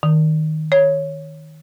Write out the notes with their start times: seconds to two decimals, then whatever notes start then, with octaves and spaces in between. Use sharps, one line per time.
0.03 D#3
0.72 C#5